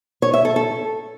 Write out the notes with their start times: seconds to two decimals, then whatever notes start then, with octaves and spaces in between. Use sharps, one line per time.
0.22 C#5
0.34 E5
0.45 A4
0.56 A4